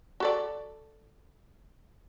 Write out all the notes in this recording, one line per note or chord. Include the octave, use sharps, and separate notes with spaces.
F#4 A4 D5